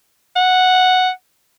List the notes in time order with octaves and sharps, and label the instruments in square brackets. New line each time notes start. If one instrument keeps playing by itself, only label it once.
[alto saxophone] F#5